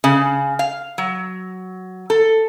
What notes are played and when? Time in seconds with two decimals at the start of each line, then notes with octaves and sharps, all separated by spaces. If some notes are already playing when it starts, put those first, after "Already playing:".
0.04 C#3
0.59 F5
0.98 F#3
2.10 A4